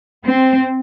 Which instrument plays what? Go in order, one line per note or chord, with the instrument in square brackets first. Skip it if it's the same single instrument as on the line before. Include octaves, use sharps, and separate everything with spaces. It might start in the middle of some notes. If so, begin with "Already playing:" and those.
[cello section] C4